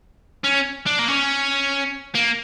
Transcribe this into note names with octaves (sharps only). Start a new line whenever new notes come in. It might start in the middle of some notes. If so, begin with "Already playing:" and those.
C#4
D4
A#3
C#4
A#3